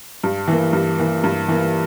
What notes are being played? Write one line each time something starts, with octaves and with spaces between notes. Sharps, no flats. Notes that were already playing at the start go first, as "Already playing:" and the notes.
G2
E3 A#3
G2
E3 A#3
G2
E3 A#3